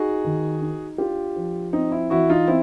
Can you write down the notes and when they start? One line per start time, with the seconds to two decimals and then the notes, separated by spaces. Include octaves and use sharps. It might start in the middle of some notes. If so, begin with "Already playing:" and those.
Already playing: D#4 F#4 G#4
0.24 D#3
0.61 D#4
0.98 D4 F4 G4
1.36 F3
1.73 C4 D#4
1.91 E4
2.10 E3 E4 F#4
2.30 D#4 F4
2.47 C4 E4